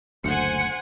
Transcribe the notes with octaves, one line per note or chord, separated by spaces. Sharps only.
F#1 D2 C5 F#5 G#5 C#7